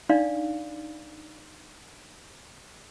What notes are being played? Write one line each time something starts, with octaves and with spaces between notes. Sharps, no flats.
D4 D#4 D5 F5